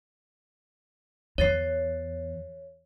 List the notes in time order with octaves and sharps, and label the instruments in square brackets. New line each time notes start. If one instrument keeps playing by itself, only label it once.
[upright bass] E2 [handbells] C#5 A6 C7